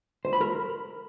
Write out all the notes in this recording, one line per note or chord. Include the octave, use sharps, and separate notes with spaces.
C5
B5
A#4